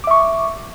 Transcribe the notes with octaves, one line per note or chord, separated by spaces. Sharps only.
E5 C#6 D6